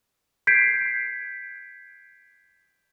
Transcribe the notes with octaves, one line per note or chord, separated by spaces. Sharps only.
G6 G#6 B6 C7 D7